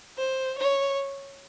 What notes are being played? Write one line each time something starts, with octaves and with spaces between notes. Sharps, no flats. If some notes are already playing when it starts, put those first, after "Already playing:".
C5
C#5